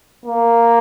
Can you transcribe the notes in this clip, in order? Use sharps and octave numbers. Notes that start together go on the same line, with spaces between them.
A#3